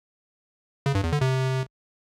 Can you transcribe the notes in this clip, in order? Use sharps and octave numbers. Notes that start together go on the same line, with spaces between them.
C#3
G2
E2
D3
C3